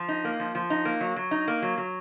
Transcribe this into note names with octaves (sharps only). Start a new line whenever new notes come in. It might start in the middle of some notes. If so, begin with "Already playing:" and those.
Already playing: F3
D#4
A#3
F3
F3
D#4
A#3
F#3
F#3
D#4
A#3
F#3
F#3